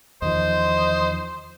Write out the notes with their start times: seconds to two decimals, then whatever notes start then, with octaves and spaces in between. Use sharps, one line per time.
0.22 E2 D#3 F3 C5 D#5